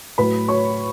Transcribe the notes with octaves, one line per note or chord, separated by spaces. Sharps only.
A2 F#3 B4 B5
C#5 C#6